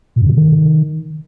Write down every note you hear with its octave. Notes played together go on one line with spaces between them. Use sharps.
A#2
F#2
C#3
C3
D#3